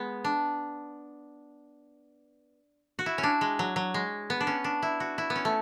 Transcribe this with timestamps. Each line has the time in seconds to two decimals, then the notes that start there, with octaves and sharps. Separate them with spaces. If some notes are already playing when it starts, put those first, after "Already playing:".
Already playing: G#3 B3
0.24 D4
2.99 F#4
3.06 E4
3.18 C#4
3.23 D4
3.41 G#3
3.59 F#3
3.76 F#3
3.94 G#3
4.30 B3
4.41 D4
4.47 C#4
4.64 D4
4.82 E4
5.00 F#4
5.18 E4
5.30 B3
5.36 C#4
5.45 A3